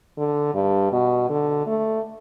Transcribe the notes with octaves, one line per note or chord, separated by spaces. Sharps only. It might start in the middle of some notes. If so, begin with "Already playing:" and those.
D3
G2
B2
D3
A3